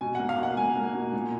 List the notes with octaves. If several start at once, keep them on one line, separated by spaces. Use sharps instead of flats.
B2 G#5
A#3 F#5
F5
B2 F#5
A#3 G#5
A#3
B2
A#2